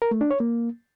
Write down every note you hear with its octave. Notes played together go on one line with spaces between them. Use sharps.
A#4
A3
D4
C#5
A#3